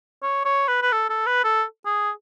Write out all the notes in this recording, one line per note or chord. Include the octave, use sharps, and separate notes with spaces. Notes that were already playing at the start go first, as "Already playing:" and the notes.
C#5
C#5
B4
B4
A4
A4
B4
A4
G#4